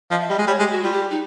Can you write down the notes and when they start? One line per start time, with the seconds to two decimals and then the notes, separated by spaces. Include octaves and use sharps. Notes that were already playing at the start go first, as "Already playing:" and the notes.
0.11 F3 D#5
0.20 E5
0.29 G3 D#5
0.38 G#3
0.47 G3 C#5
0.59 G#3 G4
0.71 F#4
0.83 G3 F4
0.93 G4
1.11 D#4